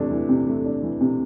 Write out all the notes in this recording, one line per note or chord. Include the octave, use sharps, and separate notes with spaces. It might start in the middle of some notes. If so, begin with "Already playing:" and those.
Already playing: C3 E3 A3 D4
E3
C3
A3
D4
E3
C3